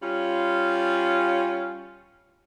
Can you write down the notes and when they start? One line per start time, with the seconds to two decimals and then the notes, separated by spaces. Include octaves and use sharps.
0.01 G3 C#4 F4